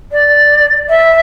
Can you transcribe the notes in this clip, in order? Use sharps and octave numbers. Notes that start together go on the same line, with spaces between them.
D5
E5